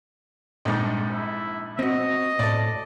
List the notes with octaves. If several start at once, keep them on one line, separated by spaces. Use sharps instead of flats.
A#1 F2 G#2
E4
C4 F#4 D#5
A2 A4 D5